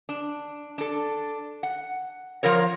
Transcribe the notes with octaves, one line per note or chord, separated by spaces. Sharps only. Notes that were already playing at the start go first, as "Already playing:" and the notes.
D4
D4 A4
F#5
F3 F4 A#4 C#5